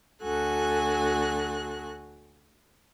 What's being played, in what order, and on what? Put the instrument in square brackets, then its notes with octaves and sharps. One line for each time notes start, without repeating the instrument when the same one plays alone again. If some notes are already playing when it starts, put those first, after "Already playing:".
[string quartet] D2 F#4 A4 G#5 F#6